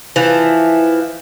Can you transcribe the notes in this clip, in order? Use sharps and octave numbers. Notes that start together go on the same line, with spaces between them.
E3 F3